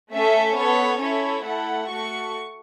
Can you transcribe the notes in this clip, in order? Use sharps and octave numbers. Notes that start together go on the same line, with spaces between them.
A3 C#4 A4 E5
B3 A4 C#5
C#4 E4 A4 C#5
A3 E4 A4 F#5
A3 F#4 A4 C#6